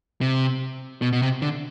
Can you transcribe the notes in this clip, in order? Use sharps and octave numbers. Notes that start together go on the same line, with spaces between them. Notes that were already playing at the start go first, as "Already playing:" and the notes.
C3
B2
B2
C3
D3